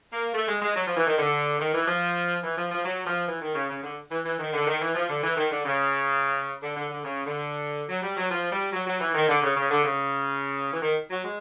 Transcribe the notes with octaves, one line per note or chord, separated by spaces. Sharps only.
A#3
A3
G#3
G#3
F#3
F3
E3
D#3
D3
D#3
E3
F3
E3
F3
F3
F#3
F3
E3
D#3
C#3
C#3
D3
E3
E3
D#3
D3
D#3
E3
F3
D3
E3
D#3
D3
C#3
D3
D3
D3
C#3
D3
F#3
G3
F#3
F3
G3
F#3
F#3
E3
D#3
D3
C#3
C#3
D3
C#3
E3
D#3
F#3
G#3